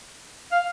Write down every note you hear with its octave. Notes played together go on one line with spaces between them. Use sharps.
F5